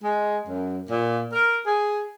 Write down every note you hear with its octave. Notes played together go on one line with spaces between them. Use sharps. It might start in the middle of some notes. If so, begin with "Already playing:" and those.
G#3
F#2
A#2
A#4
G#4